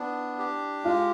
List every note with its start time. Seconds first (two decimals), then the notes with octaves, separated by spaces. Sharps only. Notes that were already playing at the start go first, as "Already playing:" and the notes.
Already playing: B3 D4 E4
0.39 G4
0.85 G#3 F4